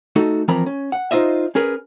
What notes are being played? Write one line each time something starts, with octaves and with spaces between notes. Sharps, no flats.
A3 D#4 F#4 A4
E3 F3 C4 A#4 A#5 B5
C#4
F#5
D#4 F4 C5 D#5 E5
C#4 G#4 A#4 B4